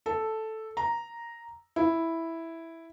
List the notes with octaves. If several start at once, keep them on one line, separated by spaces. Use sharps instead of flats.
A4
A#5
E4